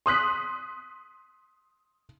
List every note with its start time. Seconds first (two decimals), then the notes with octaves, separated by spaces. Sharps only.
0.06 C6 D#6 F#6 B6